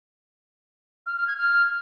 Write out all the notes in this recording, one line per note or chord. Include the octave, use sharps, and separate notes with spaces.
F6
F6
G#6
F6